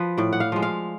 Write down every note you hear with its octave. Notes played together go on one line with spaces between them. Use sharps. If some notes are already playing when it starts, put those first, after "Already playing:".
Already playing: F3 B4
A2 D5
F#5
F5
F3 G#3
F5